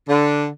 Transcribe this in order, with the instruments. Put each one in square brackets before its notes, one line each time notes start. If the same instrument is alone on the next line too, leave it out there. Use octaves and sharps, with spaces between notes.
[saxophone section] D3